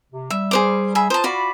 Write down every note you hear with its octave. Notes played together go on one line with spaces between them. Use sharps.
C3
G3 E5
G#4 C5 D6
G#4 E5 B5
F4 C5 A5 A#5 D#6
F4 F#4 D5 B5